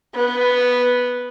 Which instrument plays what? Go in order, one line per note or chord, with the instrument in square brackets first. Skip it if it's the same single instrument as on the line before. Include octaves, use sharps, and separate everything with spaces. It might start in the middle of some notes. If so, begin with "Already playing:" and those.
[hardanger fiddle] B3